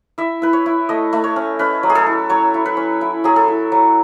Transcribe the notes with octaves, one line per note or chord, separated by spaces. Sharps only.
E4 E5
E4 B4
C#5
E4
A3 D#5
A3
C#5
C#4
C#4 B4
F#3
G#4
A4
E4
F#3 C#5
E4
B4
C#4
E4
F#3 G#4
A4
E4
F#3